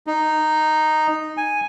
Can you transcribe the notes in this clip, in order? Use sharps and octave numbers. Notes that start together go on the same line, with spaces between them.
D#4
G#5